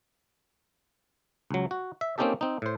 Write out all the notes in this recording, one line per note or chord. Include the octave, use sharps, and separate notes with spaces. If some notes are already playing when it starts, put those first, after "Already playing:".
C#2 F#3
F#4
E5
A#3 C4 C#4 D#4 G4 A4
C4 D#4
A2 C5